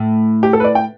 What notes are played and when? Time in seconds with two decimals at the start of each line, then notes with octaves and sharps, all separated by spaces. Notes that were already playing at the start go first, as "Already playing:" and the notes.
Already playing: A2 A3
0.43 G4
0.53 A4
0.60 B4
0.64 D5
0.75 G5